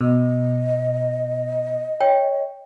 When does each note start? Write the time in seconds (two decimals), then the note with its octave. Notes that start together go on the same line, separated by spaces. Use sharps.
0.01 B2 D#5
2.01 C#5 G5